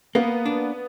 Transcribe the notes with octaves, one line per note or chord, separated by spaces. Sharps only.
A#3 B3
D4